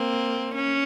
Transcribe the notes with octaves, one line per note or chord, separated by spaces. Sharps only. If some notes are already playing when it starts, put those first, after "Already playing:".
Already playing: A#3 C4
C#4